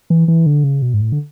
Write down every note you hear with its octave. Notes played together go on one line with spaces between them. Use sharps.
E3
E3
D3
C#3
B2
G#2
A2
D3